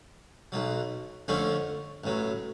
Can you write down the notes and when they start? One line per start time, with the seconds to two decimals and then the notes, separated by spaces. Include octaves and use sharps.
0.52 B1 B2 F#3
1.28 F2 D3 F3 A3 C#4
2.04 A1 A2 F#3